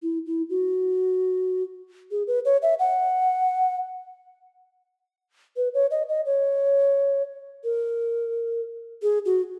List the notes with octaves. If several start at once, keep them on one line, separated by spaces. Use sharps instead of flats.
E4
E4
F#4
G#4
B4
C#5
E5
F#5
B4
C#5
D#5
D#5
C#5
A#4
G#4
F#4